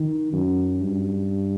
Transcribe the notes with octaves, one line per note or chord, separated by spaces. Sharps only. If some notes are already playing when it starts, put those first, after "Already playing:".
Already playing: D#3
F#2
G2